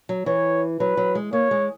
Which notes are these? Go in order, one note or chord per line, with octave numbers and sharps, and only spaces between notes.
F#3
E3 C#5
F#3 B4
F#3
G#3
A#3 C#5
G#3